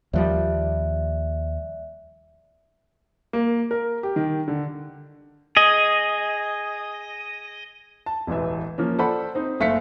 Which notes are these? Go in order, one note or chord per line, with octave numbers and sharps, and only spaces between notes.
D#2 F3 G3 D5 E5 F#6
A#3
A#4
G4
D#3
D3
G#4 D#5
A5
E1 A1 E3 E5
F3 A#3 C#4
A4 C5 D5 F#5 B5
C4 D#4
F#1 A3 F5 B6 C#7